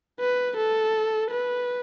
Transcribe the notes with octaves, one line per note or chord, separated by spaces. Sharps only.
B4
A4
B4